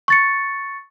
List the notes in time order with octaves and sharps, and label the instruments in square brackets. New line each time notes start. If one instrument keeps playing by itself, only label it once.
[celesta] C#6 A6 C#7